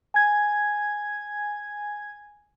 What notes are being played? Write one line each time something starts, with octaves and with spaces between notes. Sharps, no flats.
G#5 G#6